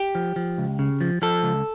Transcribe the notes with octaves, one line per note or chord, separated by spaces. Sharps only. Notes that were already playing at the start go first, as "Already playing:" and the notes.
Already playing: G4
F3
F3
C#2
C#3
F3
F3 A4
C#2